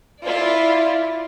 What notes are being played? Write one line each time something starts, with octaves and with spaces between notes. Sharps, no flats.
E4 F4 D5